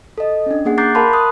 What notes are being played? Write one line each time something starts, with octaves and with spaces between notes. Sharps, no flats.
A4 D#5
C#4 D4
A#3 G#4 F#5
A#5 D6 F#6 G6 A6 C7
A#4 F5 A5 B5 C6
D#6 F#6